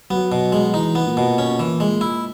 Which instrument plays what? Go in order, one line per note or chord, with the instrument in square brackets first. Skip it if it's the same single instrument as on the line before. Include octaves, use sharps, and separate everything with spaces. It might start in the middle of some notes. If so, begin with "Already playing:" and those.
[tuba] F#3 [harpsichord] B3
[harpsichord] B2
G#3
[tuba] E3 [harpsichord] D#4
[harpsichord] B3
[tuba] A#2
[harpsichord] B2
C#4
E3
G#3
E4